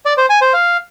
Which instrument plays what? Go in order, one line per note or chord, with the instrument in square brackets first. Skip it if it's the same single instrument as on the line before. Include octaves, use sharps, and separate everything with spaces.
[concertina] D5
C5
G#5
C5
F5